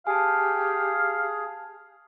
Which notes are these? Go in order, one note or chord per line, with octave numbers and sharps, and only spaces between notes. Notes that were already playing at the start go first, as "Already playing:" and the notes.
G4 G#4 F5 G#5 A5